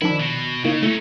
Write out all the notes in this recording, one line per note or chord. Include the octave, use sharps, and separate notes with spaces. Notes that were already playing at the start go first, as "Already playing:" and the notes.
D#3 F3 D4 E4
B2
C#3 A#3 D#4 E4
A3 C#4 D#4 E4